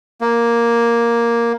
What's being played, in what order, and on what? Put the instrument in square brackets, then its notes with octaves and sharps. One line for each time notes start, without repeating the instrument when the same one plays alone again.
[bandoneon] A#3